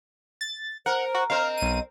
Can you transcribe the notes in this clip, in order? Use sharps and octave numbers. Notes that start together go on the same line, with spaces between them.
A6
A#4 C5 F#5
F#4
C4 A#4 C5 D#5 F5
B1 D#7